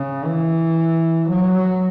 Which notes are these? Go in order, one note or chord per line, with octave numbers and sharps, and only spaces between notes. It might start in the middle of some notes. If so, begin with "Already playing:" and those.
Already playing: C#3
E3
F#3